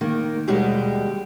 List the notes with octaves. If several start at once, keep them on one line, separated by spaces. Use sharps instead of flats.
D#3 A#3
D#2 B2 G3 G#3 G4